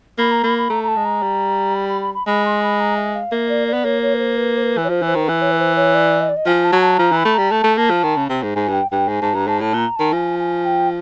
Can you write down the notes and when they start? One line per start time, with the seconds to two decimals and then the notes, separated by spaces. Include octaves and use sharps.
0.18 A#3 B5
0.31 A#5
0.43 A#3 B5
0.57 B5
0.70 A3 A#5
0.83 A#5
0.88 A5
0.96 G#3
1.05 A#5
1.22 G3
1.74 B5
1.88 B5
2.01 B5
2.14 B5
2.27 G#3 B5
2.45 C6
2.62 B5
2.80 A#5
2.96 E5
3.14 F5
3.32 A#3 E5
3.49 D5
3.67 D5
3.73 B3
3.84 A#3 C#5
4.02 C#5
4.14 B4
4.19 C5
4.36 B4
4.57 C5
4.62 B4
4.77 E3
4.84 C#5
4.89 F3 C5
5.02 E3
5.07 C5
5.15 D#3
5.24 E3 B4
5.41 C#5
5.51 B4
5.59 C5
5.76 C#5
5.94 D5
6.20 D#5
6.28 D5
6.36 D#5
6.46 F3 G#5
6.64 A5
6.72 F#3
6.81 A5
6.98 F3 A#5
7.12 E3 B5
7.25 A3
7.34 G3 A#5
7.50 A3 A5
7.64 A3
7.77 A#3 A5
7.90 F3
8.03 D#3
8.17 C#3
8.29 C3
8.43 G#2
8.55 G#2 G#5
8.68 G2 G5
8.91 G2 G5
9.08 G#2 G#5
9.22 G#2 A5
9.34 G2 A#5
9.47 G#2 A5
9.61 A2 A5
9.73 A#2 A#5
9.96 D#3 A5
10.13 F3 G#5
10.39 G#5
10.65 G5